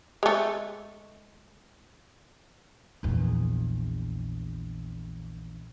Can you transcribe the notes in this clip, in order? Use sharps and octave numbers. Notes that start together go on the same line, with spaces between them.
G#3 A3
A#1 E2